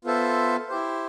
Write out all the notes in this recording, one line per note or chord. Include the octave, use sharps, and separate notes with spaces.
B3 F4 A4 C5 E5
E4 G4 C5